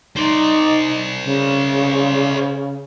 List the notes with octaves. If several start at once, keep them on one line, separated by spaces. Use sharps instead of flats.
D#4 C5 D5
C#3